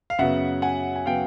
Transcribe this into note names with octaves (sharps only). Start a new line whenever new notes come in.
F5
F#2 C#3 F#3 B3 E5 F#5
F#5 G#5
G#5
C#3 F#3 B3 F5 G5